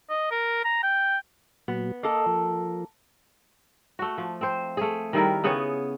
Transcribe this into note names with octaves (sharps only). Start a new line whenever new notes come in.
D#5
A#4
A#5
G5
A#2 F#3 B3
A#3 A4 D#5
F3
A3 F#4
F3
C4 C5
A3 G#4
D#3 G3 E4 A#4
C#3 B3 G#4 C#5